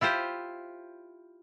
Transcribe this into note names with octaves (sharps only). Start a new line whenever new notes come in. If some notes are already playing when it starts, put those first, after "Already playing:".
E4 F4 G4 C5